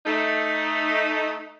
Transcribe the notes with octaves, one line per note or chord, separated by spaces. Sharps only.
A3 D#4